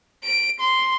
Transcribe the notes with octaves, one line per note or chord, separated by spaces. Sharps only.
D7
C6